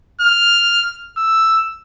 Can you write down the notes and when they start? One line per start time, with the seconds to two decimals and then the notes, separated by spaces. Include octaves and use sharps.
0.22 F6
1.17 E6